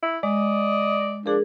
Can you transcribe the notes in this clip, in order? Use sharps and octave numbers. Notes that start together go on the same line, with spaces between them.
E4
G#3 D5 D#5
F3 D4 G#4 A#4